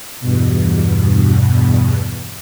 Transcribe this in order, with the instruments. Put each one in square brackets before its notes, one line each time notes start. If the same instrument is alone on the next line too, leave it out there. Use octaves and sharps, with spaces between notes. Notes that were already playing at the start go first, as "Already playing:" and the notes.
[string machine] E2 G2 B2